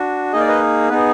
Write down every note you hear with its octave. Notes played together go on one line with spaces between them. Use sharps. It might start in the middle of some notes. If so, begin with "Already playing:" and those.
Already playing: D4 F#4
A#3 D#4 G#4 D#5
D5
B4 D#5
B3 D#4 G#4 B4